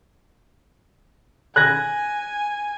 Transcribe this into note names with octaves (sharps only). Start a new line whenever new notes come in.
G#5 F#6 G#6 A#6